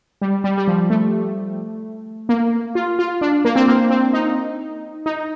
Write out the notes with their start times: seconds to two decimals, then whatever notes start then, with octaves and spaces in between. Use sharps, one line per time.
0.21 G3
0.44 G3
0.58 G3
0.68 F3
0.90 A3
2.29 A#3
2.75 F4
2.99 F4
3.21 D4
3.45 A#3
3.56 C4
3.68 A#3
3.90 C4
4.13 D#4
5.06 D#4